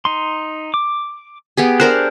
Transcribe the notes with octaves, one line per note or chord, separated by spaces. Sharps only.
D#4 C6
D6
B3 G4 G#4
D4 A#4 C5 F#6